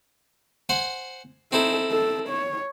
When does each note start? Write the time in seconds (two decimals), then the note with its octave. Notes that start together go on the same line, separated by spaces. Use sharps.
0.69 C5 F#5 G#5
1.52 C4 D#4 E4 A4
1.91 A4
2.29 C#5